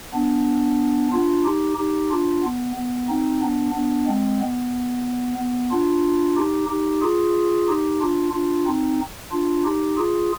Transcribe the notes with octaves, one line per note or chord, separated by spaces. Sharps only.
B3 D4
D4 F4
D#4 G4
D#4 G4
D4 F4
B3
B3
C4 D#4
B3 D4
B3 D4
G#3 C4
B3
B3
D4 F4
D#4 G4
D#4 G4
F4 G#4
D#4 G4
D4 F4
D4 F4
C4 D#4
D4 F4
D#4 G4
F4 G#4